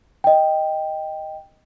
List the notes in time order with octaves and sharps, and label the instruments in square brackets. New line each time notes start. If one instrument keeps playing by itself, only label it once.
[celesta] D#5 G5